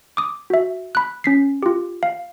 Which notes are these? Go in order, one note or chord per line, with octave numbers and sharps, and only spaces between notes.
D6 D#6
F#4 E5
B5 F#6
C#4 B6 C7
F4 G4
F5